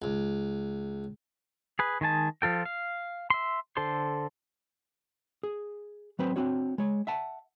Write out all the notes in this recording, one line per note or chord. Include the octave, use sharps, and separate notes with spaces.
C#2
G#4 B4
D#3 G#3 G#5 A5
F3 F4 A4 G5
F5
E5 C6
D3 A4 C5 C6
G#4
F#3 C4 B4 C5
C4 D4 F#4 C#5
G#3 C#5
E5 F#5 A5